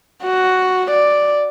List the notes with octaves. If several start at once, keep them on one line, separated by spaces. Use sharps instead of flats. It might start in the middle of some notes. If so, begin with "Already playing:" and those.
F#4
D5